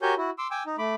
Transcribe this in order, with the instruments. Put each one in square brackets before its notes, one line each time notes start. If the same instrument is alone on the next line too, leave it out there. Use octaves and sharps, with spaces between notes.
[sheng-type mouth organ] F#4 G4 A#4 C#5 G#5 G6
E4 F#4
C6 D6 E6
G5 G#5 D6 E6
D#4
A3 B5 D6